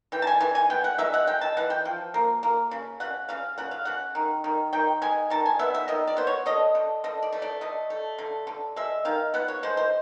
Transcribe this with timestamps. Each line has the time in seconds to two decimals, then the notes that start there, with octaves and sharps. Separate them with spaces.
0.12 E3 G5
0.22 A5
0.27 G#5
0.40 E3 G#5
0.55 G#5
0.70 B3 G5
0.84 F#5
0.98 G#3 E5
1.14 F#5
1.27 G#3 G5
1.41 A5
1.57 E3 F#5
1.70 G5
1.85 F3
2.14 A#3
2.43 A#3
2.71 C#3
3.00 C#3 F#5
3.29 C#3 F5
3.58 C#3 F#5
3.71 F5
3.85 C#3 F#5
4.15 D#3
4.44 D#3
4.73 D#3 G5
5.02 G#3 G#5
5.30 D#3 A5
5.46 G#5
5.59 B3 E5
5.75 E5
5.88 D#3 D#5
6.08 D5
6.17 B3 C5
6.27 C#5
6.46 D3 D#5
6.75 D3
7.04 D3 D#5
7.22 D5
7.32 A3
7.42 D5
7.61 D3 D#5
7.90 A3
8.18 D3
8.47 D3
8.76 G#3 E5
9.05 D#3 F5
9.34 B3 F#5
9.48 C#5
9.63 G#3 C5
9.77 C5